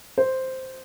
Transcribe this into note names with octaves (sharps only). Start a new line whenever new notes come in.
C5